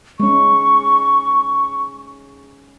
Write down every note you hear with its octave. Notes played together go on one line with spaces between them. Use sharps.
G#3 C#4 C#6